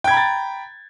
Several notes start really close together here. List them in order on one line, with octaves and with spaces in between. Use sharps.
G5 G#6 B5 A#5 A6